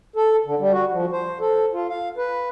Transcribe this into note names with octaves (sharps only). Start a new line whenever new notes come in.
A4
D3
G3
F#4
F3
C5
A4
F4
F5
B4